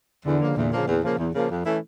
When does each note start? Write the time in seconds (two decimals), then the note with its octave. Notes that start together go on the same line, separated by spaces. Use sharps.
0.25 E2 D3
0.41 C#3 F3 A#3
0.56 E2 A#2
0.72 C#3 F3 A#3
0.87 E2
1.03 C#3 F3 A#3
1.18 E2
1.34 C#3 F3 A#3
1.49 F2
1.65 E3 A3 C#4 E4